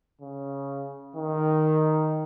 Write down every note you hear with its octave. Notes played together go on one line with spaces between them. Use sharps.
C#3
D#3